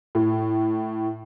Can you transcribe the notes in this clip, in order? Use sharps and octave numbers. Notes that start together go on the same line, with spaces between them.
A2